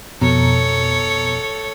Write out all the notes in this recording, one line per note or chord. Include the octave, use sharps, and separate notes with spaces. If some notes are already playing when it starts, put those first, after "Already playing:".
F2 B2 A4 C#5 A#5